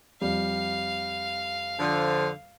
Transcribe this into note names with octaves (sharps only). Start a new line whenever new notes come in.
F2 G3 F5
D3 F3